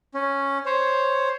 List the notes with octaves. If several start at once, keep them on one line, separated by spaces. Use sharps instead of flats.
C#4
C5 C#5